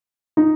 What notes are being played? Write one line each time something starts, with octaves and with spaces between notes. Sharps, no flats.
D#4